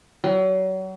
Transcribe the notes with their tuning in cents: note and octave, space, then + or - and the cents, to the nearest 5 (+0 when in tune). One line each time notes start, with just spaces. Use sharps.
F#3 +35